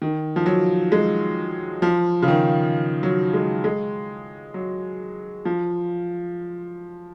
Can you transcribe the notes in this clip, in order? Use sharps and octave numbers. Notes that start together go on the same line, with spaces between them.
D#3
F3
F#3
G#3
F3
C#3
D#3
F#3
G#3
G#3
F#3
F3